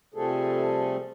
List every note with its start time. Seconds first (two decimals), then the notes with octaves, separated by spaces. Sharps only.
0.14 C3 F3 G3 A3 G#4 A4